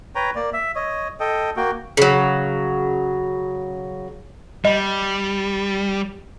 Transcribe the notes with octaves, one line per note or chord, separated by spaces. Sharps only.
B4 C#5 G5 A#5
A#3 D5
E5
C#5 D#5
A4 D#5 G5
A#3 F#4 G5
C#3 F#3
G3 D#5